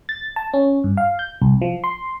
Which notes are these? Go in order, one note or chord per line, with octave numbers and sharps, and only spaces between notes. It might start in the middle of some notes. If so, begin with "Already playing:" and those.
A6
A5
C#4
G2
F5
G6
C2
F3
C6